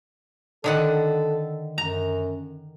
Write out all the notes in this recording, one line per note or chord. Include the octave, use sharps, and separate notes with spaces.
D3 D#3 A4 F#5
F#2 A#5